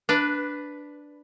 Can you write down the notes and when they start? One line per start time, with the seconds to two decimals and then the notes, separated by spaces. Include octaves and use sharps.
0.09 D4 B4